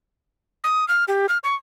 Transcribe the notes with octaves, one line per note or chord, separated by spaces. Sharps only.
D#6
F6
G4
F6
C#6